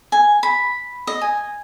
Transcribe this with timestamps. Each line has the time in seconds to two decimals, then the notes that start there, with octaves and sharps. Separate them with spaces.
0.12 G#5
0.43 B5
1.07 D#5
1.21 G#5